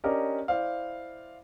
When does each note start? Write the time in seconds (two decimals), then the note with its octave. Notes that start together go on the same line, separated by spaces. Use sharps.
0.04 C#4 D4 G4 A#4 D5 D#5
0.48 E4 C5 D5 F5